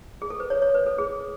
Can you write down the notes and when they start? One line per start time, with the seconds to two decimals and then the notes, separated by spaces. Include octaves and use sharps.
0.22 G#4
0.30 A4
0.40 B4
0.50 C#5
0.62 C#5
0.74 B4
0.87 A4
0.98 G#4